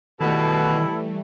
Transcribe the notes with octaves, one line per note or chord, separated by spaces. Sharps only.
B2 D#3 E3 G3 A3 E4 G4 A4